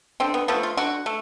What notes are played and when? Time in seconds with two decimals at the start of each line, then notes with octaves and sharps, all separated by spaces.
0.20 D3 C4
0.34 B3
0.48 F3 A3 B3
0.63 F4
0.77 D3 F#4
1.06 A3